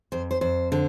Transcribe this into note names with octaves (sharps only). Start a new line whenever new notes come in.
F2 C5
C5
F2 C5
D3 C5